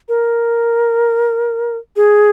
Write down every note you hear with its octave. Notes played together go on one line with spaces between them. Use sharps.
A#4
G#4